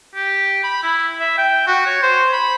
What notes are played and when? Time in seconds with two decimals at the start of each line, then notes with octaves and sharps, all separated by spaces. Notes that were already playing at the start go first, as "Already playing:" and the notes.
0.15 G4
0.64 B5
0.83 E4
1.20 E5
1.38 G5
1.67 F#4
1.86 C#5
2.03 C5
2.33 B5